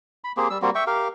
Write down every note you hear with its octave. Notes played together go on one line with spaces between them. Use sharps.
B5
A#3 C4 G4 G#4
G3 E6
G3 A#3 C4 F#4
E5 G5 C#6
G4 A#4 F5